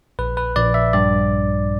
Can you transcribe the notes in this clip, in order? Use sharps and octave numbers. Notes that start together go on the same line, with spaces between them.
A#1 B4
B4
A#1 D5
E5
G2 D5